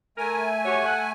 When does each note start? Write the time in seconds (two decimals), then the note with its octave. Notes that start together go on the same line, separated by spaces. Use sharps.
0.18 A3 A#4 G#5
0.65 F#4 G4 C#5
0.86 F#5